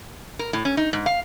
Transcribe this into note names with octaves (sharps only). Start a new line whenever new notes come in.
A#4
A2
C#4
D#4
G#2
F5